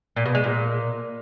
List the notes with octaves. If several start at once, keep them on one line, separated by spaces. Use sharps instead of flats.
A#2
B2
G#3
A#2